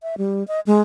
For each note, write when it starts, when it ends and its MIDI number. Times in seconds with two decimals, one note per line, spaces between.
0.03 0.16 76
0.18 0.46 55
0.48 0.60 75
0.66 0.82 56